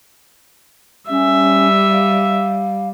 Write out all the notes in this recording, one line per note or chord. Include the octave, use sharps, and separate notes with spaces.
G3 C#4 E5
F5